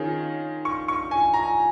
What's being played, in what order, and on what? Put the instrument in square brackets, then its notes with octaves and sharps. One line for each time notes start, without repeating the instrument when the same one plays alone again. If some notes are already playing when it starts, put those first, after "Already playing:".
Already playing: [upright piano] D#3 C#4 F4 G#4
[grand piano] C#6
C#6
G#5
A#5